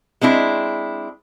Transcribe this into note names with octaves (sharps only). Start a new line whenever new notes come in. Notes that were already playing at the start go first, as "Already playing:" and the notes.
G#3 C4 D4 E4